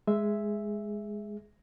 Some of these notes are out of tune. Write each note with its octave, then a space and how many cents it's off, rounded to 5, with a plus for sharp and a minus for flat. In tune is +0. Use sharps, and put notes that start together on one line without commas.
G#3 +0 G#4 +0 E5 +0